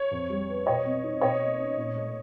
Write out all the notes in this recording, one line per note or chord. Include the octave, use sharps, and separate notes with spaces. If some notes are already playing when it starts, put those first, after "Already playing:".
Already playing: C#5
F2
G3
B3
B2 C#5 D#5
C4
D#4
B2 C#5 D#5
A#3
C#4
A#2
A3